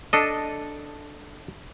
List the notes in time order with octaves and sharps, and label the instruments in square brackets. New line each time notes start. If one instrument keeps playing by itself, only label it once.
[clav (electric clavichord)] D4 A4 D#5